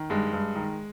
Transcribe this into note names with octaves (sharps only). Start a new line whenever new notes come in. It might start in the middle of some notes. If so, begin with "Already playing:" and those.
Already playing: D#3
G2 G#3
G2
D#3